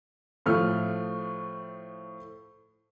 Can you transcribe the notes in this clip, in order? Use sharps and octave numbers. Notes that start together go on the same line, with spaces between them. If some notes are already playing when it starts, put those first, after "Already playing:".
A2 F3 A3 F6